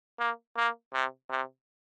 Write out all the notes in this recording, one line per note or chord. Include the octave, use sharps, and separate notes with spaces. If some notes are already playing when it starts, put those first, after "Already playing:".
A#3
A#3
C3
C3